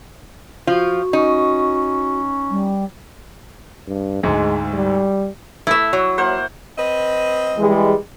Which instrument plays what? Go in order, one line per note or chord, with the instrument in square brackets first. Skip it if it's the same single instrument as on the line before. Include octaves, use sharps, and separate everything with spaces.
[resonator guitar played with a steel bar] F3 F4 [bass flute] F#4
[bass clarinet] C#4 [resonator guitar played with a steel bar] D#4
[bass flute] G3
[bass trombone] G2
[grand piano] D2 G#2 [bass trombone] G#3
[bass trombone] G3
[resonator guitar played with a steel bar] A3 [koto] E4 E5
[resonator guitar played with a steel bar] F#3
[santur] A#3 C5 F#5
[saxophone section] C4 B4 D#5
[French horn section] E3 G3 G#3